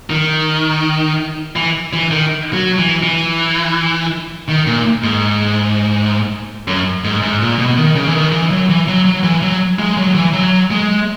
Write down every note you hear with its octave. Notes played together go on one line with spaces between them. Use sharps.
D#3
E3
E3
D#3
F#3
E3
E3
D#3
A#2
G#2
F#2
G#2
G#2
A#2
B2
D#3
C#3
E3
D#3
E3
F#3
E3
F#3
F#3
E3
F#3
G#3
F#3
E3
F#3
G#3